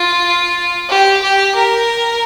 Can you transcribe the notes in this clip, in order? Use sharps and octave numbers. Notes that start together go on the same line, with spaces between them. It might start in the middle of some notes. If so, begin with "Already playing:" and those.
Already playing: F4
G4
G4
A#4